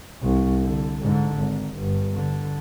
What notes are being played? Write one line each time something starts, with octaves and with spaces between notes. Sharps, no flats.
C2
D3
G#2 D3
G#1
G1
D3